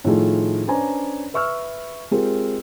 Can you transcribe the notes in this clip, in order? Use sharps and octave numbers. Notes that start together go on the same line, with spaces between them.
A2 D#3 F3 A3 F4 G#4
C#4 D4 B4 C5 G#5 A#5
B4 E5 C#6 E6 F6
G#3 C4 F4 G4 G#4 A#4